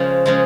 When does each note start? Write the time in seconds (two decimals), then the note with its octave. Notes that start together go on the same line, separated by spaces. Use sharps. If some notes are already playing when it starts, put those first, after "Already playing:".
Already playing: C#3 F3 G#3
0.26 C#3 F3 G#3